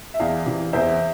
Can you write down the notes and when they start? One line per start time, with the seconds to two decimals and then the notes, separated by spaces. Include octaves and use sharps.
0.14 E5
0.19 E2 D5 F5
0.46 C3 E3
0.73 E2 C5 E5